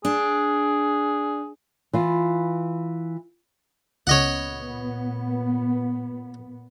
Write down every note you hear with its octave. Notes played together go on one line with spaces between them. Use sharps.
D4 G#4
E3 F4
C#2 A#2 C#3 B3 C#5 D#5 F#5